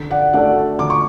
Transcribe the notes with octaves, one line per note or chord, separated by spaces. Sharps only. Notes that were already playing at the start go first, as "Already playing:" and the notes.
Already playing: D3
D5 F#5
A3 D4 F#4 A4 D5 F#5
D3 D6
C#6